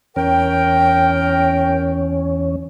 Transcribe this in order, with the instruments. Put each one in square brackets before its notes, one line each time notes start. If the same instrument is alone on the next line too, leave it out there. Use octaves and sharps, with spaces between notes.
[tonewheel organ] E2 C#4 [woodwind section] A#4 G5